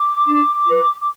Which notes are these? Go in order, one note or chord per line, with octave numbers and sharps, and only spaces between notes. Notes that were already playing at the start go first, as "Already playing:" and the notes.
Already playing: D6
D4
F4 B4
D6